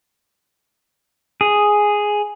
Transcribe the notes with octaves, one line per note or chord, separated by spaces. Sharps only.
G#4